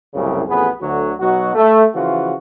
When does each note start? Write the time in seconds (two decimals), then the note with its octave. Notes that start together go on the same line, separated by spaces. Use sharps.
0.14 C2 F#2 A2 C#3
0.48 A1 F2 B3 G#4 B4
0.81 D2 D3 F#3 F#4
1.20 B2 F#3 D#4 F#4
1.55 A3
1.95 C#3 E3 F3 F4 F#4